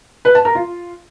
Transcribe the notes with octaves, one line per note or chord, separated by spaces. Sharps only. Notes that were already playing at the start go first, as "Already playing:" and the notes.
B4
A5
A#4
F4